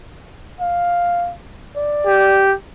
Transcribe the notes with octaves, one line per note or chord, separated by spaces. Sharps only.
F5
D5
G4